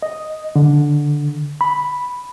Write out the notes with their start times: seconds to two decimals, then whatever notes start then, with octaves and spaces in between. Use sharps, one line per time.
0.02 D#5
0.56 D3
1.61 B5